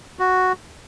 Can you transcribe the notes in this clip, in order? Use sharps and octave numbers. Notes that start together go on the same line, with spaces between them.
F#4